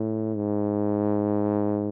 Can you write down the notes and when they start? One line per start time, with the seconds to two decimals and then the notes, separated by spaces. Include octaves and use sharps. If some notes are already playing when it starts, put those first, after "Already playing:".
Already playing: A2
0.36 G#2